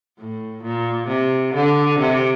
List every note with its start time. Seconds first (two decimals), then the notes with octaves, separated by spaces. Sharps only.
0.18 A2
0.63 A#2
1.08 C3
1.54 D3
1.99 C3